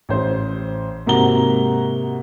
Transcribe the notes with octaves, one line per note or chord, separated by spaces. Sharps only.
A1 C5
G#2 C3 A#3 F#4 A#5 G7